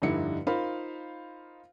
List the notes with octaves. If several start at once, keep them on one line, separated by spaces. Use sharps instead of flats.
F1 G2 D3 D#4 E4 C#7
D#4 F4 A#4 C5 F5 B5